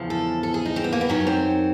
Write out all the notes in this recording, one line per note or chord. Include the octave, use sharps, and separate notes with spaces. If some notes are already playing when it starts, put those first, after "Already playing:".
Already playing: E2 C#3 F3
A4
A4
G#4
D#4
C4
B3
A#3
B3
F#2 D#3 F#3 C#4
C4